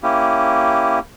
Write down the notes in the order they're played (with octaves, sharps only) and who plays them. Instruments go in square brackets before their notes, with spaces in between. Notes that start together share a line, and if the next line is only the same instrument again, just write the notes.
[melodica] A#3 C#4 E4 G4